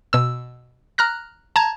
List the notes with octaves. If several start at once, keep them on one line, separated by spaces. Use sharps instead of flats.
B2 E6
A#5 F6 F#6 A#6
A5 A#5 G#6